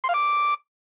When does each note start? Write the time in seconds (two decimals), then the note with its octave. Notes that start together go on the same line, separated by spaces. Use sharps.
0.04 C6
0.09 F5
0.14 D6